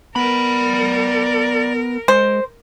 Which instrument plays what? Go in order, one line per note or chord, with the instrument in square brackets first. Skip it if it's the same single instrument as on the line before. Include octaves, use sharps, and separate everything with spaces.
[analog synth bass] B3 [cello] A#4 [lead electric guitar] D5 B5
[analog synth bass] G#3 [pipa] C5